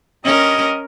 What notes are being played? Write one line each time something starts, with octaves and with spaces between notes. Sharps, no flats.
G2 C#4 A#4 D#5